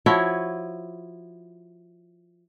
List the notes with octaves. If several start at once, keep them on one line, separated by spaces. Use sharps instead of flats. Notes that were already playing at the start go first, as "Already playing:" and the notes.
F3 E4 F#4 C#5